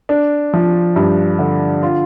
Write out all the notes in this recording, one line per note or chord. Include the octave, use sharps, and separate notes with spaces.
D4
F3
G2
D3
F4